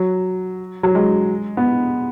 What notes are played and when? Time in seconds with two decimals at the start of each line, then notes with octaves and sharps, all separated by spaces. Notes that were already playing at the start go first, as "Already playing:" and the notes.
Already playing: F#3
0.83 F#3
0.95 G#3
1.57 B3